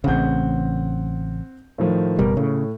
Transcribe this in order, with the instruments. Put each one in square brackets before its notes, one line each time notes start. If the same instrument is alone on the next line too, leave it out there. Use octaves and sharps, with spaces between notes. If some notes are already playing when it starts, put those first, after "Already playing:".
[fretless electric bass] A1 C#3 [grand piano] C4 F#5 G6
[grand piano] A2 D#3 F3
[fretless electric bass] F#1 B2 G3 [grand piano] A#4
[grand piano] A2 [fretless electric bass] C#3